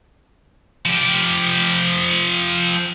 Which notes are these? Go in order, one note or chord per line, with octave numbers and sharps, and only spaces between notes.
F3 G4